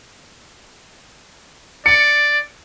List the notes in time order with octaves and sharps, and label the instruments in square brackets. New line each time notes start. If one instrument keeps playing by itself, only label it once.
[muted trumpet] D5 [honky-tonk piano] C#7